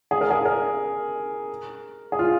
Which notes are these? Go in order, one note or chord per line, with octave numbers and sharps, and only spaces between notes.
G#4
A#4
G#4
A#4
G#4
F4